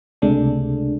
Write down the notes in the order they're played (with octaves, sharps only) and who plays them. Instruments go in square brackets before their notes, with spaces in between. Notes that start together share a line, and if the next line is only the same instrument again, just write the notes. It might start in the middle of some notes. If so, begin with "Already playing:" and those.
[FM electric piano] C#2 C3 G#3 A3 D4